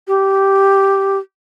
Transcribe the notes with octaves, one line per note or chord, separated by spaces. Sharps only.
G4